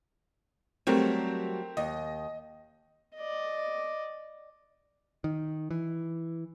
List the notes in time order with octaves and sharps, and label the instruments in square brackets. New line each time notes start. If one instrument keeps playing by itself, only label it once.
[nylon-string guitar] F#3 G3 A3 [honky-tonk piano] C4 G4 A#4
[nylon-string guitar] D#2 [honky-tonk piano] D#5
[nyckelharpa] D5 D#5
[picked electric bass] D#3
E3